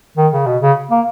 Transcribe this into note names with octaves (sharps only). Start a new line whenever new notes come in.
D#3
C#3
B2
C#3
A#3